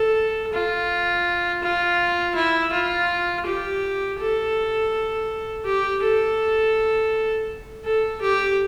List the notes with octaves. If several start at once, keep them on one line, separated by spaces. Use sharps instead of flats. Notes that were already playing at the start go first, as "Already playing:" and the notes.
Already playing: A4
F4
F4
E4
F4
G4
A4
G4
A4
A4
G4